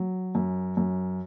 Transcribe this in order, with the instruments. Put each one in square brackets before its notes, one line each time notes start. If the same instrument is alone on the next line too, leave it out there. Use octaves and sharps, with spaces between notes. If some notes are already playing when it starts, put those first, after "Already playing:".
Already playing: [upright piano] F#3
F#2
F#2